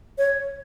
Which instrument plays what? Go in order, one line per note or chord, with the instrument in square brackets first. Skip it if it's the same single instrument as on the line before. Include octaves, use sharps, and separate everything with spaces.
[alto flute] C#5